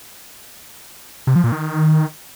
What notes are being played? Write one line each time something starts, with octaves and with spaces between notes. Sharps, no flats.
C3
F3
A#2
D#3